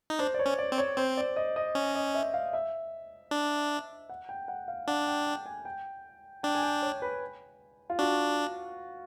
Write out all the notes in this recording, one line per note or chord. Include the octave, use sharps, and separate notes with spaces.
D#4
D4 C5
D5
C#5
C#4
D5
C4
C#5
C4 C5
D5
D#5
D#5
C#4
D#5
E5
F5
E5
D4
F#5
G5
F#5
F5
D4 F#5
G5
G5
G#5
G5
D4 G5
G#5
G5
C#5
B4
F4
D4 F#4